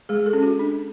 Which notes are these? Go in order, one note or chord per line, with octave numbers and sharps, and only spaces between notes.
G#3 G#4
A4
C#4
F#4
D4